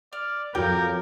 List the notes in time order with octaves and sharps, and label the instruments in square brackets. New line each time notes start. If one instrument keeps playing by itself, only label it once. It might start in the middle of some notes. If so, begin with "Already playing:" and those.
[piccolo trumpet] D5 [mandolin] F6
[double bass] F2 [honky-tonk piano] F#3 D6 [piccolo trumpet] A#4 [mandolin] G5